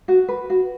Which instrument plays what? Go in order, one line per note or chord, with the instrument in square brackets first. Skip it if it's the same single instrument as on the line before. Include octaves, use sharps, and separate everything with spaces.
[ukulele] F#4
B4
F#4